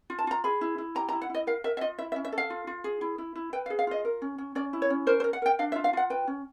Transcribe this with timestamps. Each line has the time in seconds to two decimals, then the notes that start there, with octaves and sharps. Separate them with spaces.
0.10 F4
0.19 A5
0.27 F4 A#5
0.44 G#4 B5
0.61 E4
0.78 E4
0.95 G4 A#5
1.09 A#5
1.12 E4
1.22 F#5
1.30 E4 D#5
1.47 A#4 F5
1.64 A#4 E5
1.77 E5
1.81 F4 D#5
1.98 E4 E5
2.12 E5
2.16 C#4
2.25 E5
2.32 A4
2.38 F5
2.50 F4
2.67 F4
2.84 G#4
3.01 E4
3.18 E4
3.36 E4
3.53 B4 G5
3.66 F5
3.70 G#4
3.79 F5
3.87 F4 D#5
4.05 A#4
4.22 C#4
4.38 C#4
4.55 C#4 D5
4.73 E4
4.82 C#5
4.90 C#4
5.07 A#4 C5
5.20 C5
5.24 A#4
5.33 F#5
5.42 A#4 G5
5.59 D4 F5
5.72 E5
5.76 F4
5.84 F5
5.93 F4 F#5
6.10 B4 G5
6.27 C#4